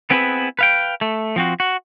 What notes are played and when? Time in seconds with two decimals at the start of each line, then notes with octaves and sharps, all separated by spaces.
0.10 B3 C4 E4 G#4 A#4 B4
0.59 B4 F5 G5
1.01 A3
1.36 F3 C4 F#4
1.60 F#4